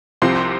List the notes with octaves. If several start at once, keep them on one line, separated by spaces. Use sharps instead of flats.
C2 C3 F3 C4 C6